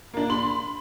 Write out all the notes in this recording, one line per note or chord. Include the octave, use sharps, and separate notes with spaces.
A#3 D4
B5 C6 F#7